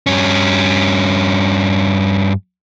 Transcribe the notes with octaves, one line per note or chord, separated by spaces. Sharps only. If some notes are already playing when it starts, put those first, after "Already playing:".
G2 C#4